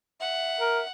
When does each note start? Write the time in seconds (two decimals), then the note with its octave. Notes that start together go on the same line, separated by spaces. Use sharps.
0.20 E5 F#5
0.60 A#4